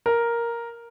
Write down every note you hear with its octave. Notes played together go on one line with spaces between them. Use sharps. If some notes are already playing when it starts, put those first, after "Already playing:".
A#4